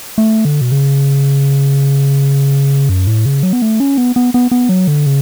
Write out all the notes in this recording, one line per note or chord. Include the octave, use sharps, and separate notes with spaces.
A3
D3
B2
C#3
F#2
A2
C#3
F#3
B3
A3
C#4
B3
B3
B3
B3
F#3
D3
C#3